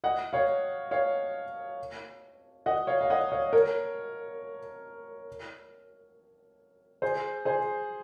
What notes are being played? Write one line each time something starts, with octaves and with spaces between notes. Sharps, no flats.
D#5 F#5
C#5 F5
C#5 F5
D#5 F#5
C#5 F5
F5
D#5 F#5
C#5 F5
A#4 C#5
G#4 C5
G#4 C5